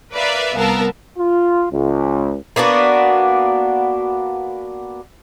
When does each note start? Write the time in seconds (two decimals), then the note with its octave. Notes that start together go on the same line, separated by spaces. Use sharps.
0.13 A#4 B4 D5 E5 F5
0.56 C2 B3 A#4 F5 A5 E6
1.19 F4
1.72 C#2
2.56 A#3 B3 D4 F#4